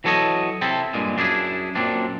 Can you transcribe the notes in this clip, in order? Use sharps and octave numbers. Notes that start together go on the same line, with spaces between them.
E3 F#3 A4 C#5 D#5
C3 C4 E4 A4
G2 A#2 G#3
F#2 D4 E4 F#4 G#4
F#2 A#2 C4 D4